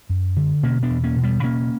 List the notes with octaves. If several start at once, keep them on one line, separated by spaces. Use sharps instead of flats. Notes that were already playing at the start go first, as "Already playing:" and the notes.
F#2
D3
B2 A#3 C#4
B3 D4
E2
A#3 C#4
B2
G3 B3
C#3 A#3 C#4